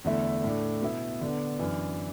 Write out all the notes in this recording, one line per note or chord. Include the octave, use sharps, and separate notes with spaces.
E2 D3 A3 E4
A2 A3 D4
B2 B3 E4
D3 B3 D4
F#2 E3 D4